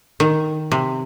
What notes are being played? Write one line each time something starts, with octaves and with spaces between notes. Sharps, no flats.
D#3
C3